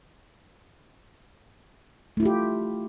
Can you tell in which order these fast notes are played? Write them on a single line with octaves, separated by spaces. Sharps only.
A3 E4 F4 G4